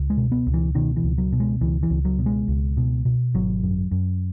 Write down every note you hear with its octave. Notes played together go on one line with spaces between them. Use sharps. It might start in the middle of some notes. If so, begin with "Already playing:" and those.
Already playing: C#2
G#3
B2
B3
C#2
E3
B2 D#3
E3
C#2
F#3
B2
G#3
C#2 E3
E3
C#2
F#3
B2
G#3
C#2
B2
B2
G#1 F#3
F#2
F#2